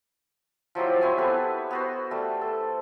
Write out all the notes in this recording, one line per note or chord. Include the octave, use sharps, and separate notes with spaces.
F3 F#3 E4 G4
C4 E4 C#5 G#5
B3 G4 A4 B4
B3 F#4 C5
G3 A3
A4